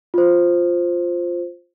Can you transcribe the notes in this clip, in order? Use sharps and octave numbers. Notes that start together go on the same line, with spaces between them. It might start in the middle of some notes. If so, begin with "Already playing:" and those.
F4 C5